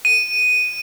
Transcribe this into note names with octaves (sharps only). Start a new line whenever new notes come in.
D#7